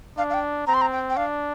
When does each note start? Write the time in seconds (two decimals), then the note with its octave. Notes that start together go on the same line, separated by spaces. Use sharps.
0.18 D4 F5
0.30 F5
0.34 G5
0.67 C4 A#5
0.74 C6
0.81 A#5
0.92 G5
1.10 G5
1.17 D4 F5